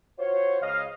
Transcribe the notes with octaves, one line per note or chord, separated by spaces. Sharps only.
F4 F#4 C5 C#5
C#2 C#3 D#5 F5